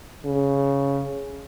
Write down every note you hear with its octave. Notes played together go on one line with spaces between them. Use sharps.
C#3